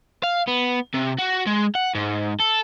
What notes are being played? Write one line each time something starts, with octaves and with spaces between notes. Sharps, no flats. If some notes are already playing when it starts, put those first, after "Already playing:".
F5
B3
C3
F#4
G#3
F#5
G#2
A4